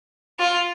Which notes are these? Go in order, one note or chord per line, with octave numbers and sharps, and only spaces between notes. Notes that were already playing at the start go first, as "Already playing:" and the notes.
F4